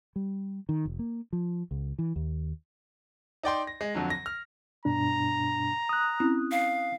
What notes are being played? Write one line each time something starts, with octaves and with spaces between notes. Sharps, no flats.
G3
D#3
F1
A#3
F3
C#2
E3
D#2
D#4 D5 G5 C6
A#6
G#3
F2 D3 F#3
A#6
F6
G2 B2 D4 A#5
D#6 F#6
C4 C#4 E4
F5